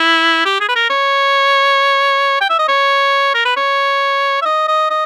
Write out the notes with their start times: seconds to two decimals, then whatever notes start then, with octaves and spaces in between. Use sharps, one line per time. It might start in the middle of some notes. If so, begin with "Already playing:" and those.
Already playing: E4
0.46 G4
0.60 G#4
0.68 B4
0.75 A#4
0.90 C#5
2.41 G5
2.50 E5
2.59 D#5
2.68 C#5
3.34 A#4
3.45 B4
3.56 C#5
4.42 E5
4.45 D#5
4.68 D#5
4.90 D#5